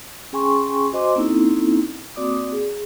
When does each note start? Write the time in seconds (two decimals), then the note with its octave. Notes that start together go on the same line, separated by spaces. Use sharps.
0.33 C#4 G#4 G5 G#5 C6 C#6
0.93 F#4 C5 D#5 G#5 C6 D6
1.16 A#3 C4 C#4 D#4 E4 A4
2.16 A#3 C4 F#4 D5 D6 D#6
2.52 G#4